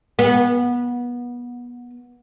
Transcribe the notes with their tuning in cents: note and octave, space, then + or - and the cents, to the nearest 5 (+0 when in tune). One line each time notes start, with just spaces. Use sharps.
B3 -25